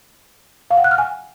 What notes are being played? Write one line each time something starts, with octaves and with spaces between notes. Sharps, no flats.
F5
F#5
F#6
F6
G#5